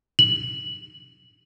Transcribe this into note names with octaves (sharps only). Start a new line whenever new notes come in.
F#7